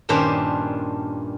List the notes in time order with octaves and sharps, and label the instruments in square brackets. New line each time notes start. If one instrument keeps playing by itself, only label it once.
[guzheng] G2 A#2 D#3 C#4 D4 C5